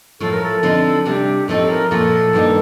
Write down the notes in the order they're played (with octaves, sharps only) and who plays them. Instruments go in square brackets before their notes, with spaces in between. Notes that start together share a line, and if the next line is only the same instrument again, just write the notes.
[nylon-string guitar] A2 F3 A3 [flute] A4
[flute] A#4
A4
[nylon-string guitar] D3 F3 C4 D#4
[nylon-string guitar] C3 G3 D4 [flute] G4
[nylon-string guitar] A2 F3 C4 D#4 [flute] A4
[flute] A#4
[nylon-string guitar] A#2 F3 A3 [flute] A4
[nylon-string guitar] G2 D#3 A#3 D#4